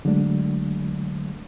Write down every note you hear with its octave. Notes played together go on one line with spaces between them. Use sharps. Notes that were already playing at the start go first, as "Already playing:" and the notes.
D3 F#3 G#3 A3 D4